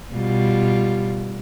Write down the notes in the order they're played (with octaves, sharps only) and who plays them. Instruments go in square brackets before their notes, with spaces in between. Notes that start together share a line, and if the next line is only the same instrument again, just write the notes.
[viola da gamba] B2 G3 F4